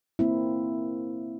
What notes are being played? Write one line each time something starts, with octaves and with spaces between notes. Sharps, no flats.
A#3 C4 E4